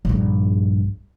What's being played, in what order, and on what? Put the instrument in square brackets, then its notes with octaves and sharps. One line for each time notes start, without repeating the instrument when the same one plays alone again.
[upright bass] A#1 G2